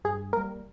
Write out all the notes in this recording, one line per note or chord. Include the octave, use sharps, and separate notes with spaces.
G2 G#4
G3 A#3 A#4